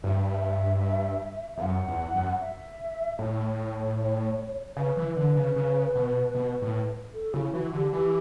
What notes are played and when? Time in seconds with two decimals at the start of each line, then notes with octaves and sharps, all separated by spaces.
0.03 G2 E5
1.57 E2 E5
1.62 F#2 F#5
1.88 E2
2.14 F#2
2.40 E5
3.19 A2 C#5
4.77 C#3 B4
4.97 E3
5.16 D3
5.36 C#3
5.56 C#3
5.95 B2
6.35 B2
6.62 A2
7.14 A4
7.34 C#3 E4
7.53 E3 F#4
7.73 D3 G4
7.92 E3 G4